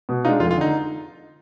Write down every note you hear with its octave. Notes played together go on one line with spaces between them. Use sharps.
B2
G#3 D4 D#4 F4
F1 F4
F4
D3 D#4